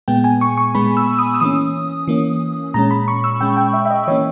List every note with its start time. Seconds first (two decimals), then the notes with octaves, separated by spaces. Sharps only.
0.08 A#2 G#3 B3 G5
0.24 G#5
0.41 C#6
0.58 C#6
0.75 A#2 G#3 B3 B5
0.97 E6
1.18 D#6
1.34 E6
1.40 E3 A#3 C#4 D#6
2.08 E3 A#3 C#4
2.74 A#2 G#3 C#4 A#5
2.91 B5
3.08 C#6
3.24 E6
3.41 A#2 G#3 C#4 G5
3.57 G5
3.74 E5
3.85 E5
3.90 D#5
4.07 E3 A#3 C#4 C#5